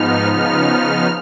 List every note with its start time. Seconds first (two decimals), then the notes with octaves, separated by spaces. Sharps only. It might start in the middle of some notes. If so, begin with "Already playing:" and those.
Already playing: G#2 F3 B3 D#4 F6
0.32 C#3 F3 B3 D#4 F6